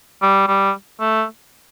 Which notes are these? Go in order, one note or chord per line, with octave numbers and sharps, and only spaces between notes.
G3
G3
A3